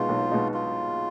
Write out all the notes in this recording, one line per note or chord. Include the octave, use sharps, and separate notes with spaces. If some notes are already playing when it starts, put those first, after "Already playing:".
Already playing: B2 G#3 D#4 F4
B1
B2 G#3 D#4
F4